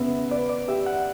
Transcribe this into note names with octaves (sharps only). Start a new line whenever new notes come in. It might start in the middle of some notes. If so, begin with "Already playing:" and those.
Already playing: C#3 B3 E5
B4 D5
D5
G4 E5
F#5
E5